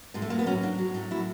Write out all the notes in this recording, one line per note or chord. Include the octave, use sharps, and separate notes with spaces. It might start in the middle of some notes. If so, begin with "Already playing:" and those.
A2 G#3
A3
F#3 A#3
B3
F#3 C#4
A2 D4
F#3
A2 D#4
F#3 E4